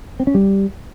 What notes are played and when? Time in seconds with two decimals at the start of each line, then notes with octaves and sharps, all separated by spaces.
0.20 C4
0.27 C#4
0.34 G3